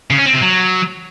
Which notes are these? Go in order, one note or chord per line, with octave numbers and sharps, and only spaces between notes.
C#3
C#4
C4
C3
F#3